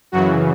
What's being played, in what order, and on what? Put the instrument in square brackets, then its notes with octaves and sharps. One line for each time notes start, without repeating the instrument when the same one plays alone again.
[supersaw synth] F#2 C#3 E3 F#3 F#4